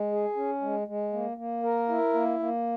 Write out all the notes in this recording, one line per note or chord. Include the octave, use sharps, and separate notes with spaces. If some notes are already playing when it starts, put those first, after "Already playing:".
Already playing: G#3
G#4
C#4
G#3
G#3
A#3
A#3
A#4
E4
A#3
A#3